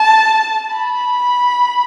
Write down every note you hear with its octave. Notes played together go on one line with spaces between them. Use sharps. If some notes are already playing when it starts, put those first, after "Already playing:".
Already playing: A5
B5